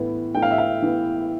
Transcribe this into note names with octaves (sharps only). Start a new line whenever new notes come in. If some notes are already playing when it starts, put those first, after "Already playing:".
Already playing: A2 E3 B3
A2 G5
F5
E5
F5
E3 B3